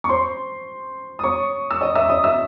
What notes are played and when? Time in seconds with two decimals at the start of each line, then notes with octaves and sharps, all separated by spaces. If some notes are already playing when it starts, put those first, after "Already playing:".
0.04 C#6
0.09 C5 C6
1.19 D#6
1.24 C#5 C#6
1.71 E6
1.81 D#5 D#6
1.95 E5 E6
2.09 D#5 D#6
2.24 E5 E6